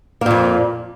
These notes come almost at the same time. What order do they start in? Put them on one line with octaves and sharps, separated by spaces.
A#3 A#2 F2